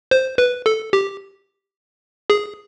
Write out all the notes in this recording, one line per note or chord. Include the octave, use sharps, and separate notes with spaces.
C5
B4
A4
G4
G#4